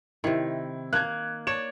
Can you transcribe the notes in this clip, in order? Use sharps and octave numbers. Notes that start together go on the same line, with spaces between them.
C3 D#3 E4
A#3 F#6 G#6
C#5 D5 E7